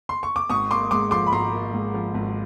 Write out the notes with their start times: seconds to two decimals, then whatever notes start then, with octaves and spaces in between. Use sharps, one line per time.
0.09 C6
0.23 C#6
0.36 D6
0.49 G#1 C#6 D#6
0.70 A#3 C6 D6
0.91 G#2 C6 D6
1.11 F3 C6 D6
1.27 B5
1.31 G#1 A#5 C6
1.52 A#3
1.73 G#2
1.94 F3
2.14 G#1